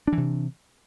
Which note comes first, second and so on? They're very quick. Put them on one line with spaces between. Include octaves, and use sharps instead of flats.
D4 E3 C3